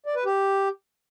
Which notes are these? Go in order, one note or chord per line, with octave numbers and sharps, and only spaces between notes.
D5
B4
G4